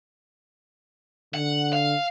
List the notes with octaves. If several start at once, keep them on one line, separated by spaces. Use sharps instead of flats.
D3 F#5
F5